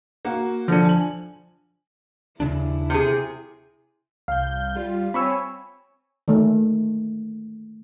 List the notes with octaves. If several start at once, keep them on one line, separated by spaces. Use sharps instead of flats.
A#3 F#4
D3 F3 D4
G#5 F#7
D#2 C#3 D4 E4
C3 G#4
C2 F5 G6
G3 F4
C4 C#5 G#5 B5 C#6 E6
D#3 A3